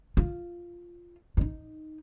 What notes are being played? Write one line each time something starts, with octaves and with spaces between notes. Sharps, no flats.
F4
G2 D#4